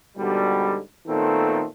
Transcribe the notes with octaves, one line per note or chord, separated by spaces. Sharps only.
G#2 B2 D3 G3
A#2 D#3 A3 B3 C4 A4